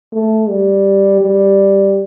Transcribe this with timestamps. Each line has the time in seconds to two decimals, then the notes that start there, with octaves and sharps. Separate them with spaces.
0.13 A3
0.49 G3
1.21 G3